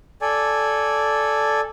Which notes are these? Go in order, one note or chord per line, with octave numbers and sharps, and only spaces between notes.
A4 D5 G#5